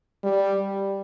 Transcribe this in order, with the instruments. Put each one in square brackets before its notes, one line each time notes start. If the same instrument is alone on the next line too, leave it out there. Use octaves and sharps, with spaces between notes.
[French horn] G3